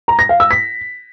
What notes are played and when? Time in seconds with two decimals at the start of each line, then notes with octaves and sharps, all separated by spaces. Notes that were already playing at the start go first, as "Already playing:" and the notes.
0.08 A#5
0.19 A#6
0.29 F5
0.40 E6
0.51 B6